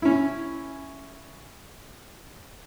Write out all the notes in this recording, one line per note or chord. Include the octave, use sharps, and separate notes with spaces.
C#4 E4